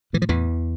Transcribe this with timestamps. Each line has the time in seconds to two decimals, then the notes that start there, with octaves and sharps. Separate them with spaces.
0.13 A2 E3
0.22 F3
0.29 E2 E3